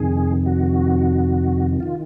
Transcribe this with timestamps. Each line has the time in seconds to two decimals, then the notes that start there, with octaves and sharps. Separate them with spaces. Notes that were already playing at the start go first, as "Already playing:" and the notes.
Already playing: F2 C3 D#3 G#4
0.46 F#4
1.80 D#3 F4